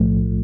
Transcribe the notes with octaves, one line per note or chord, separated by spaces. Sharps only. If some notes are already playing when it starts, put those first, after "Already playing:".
Already playing: B1 A2 F3 A3